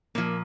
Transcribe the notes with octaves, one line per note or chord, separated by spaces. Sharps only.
A#2 F3 A#3